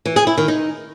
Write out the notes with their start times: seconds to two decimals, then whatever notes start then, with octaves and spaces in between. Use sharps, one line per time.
0.06 E3
0.16 G#4
0.27 E4
0.38 D#3
0.48 D#4